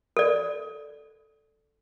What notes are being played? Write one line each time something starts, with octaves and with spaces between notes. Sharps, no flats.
A4 D5